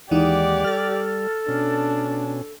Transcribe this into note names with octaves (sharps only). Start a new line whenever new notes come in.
D#2 E3 G#3 D#4 G4 D5 F#5
G3 A4 F6 A6
B2 C#4 D4